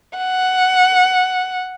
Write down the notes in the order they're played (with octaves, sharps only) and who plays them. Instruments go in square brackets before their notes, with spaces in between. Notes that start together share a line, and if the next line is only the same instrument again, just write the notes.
[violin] F#5